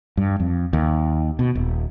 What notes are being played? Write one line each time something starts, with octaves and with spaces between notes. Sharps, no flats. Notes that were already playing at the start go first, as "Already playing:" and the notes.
G2
F2
D#2
B2
D#1